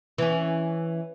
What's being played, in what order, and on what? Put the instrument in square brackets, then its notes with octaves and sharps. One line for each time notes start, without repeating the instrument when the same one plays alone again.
[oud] E3 C#4